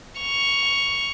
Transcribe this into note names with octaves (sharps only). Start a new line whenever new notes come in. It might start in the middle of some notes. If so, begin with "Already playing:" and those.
C#6 F7